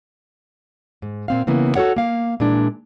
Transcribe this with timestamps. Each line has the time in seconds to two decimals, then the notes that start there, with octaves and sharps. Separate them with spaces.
1.02 G#2
1.28 A#2 C4 F5
1.47 C#3 E3 A#3 B3
1.75 F#4 A4 A#4 C#5 F#5
1.96 A#3 F5
2.40 A#2 E3 G#3 D4